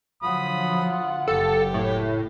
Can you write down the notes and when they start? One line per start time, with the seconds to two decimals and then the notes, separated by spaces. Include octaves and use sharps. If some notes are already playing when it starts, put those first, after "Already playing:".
0.23 D3 F3 F#3 F4 F#5 B5 D#6
1.28 F#1 G4 A4
1.74 A2